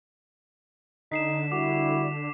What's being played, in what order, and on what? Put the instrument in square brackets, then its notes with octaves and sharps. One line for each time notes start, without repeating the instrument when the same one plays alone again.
[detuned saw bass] D3 [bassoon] D#4 [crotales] B6 C7 E7
[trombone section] G3 E4 [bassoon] F#4 [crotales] D6